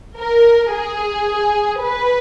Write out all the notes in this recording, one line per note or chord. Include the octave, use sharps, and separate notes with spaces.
A#4
G#4
B4